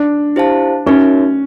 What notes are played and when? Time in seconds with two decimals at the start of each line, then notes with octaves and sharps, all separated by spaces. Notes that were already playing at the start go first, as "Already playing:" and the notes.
Already playing: D4
0.36 E4 G4 C5 F5 A5
0.86 C#4 D#4 F#4 A#4 C#5 E5